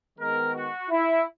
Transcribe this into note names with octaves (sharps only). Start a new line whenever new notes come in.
D#3 G#3 B3 A#4
F#4
E4